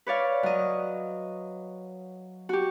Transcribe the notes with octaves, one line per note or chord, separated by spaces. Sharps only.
B4 C#5 D5 F5
F#3 D#5
F#4 G4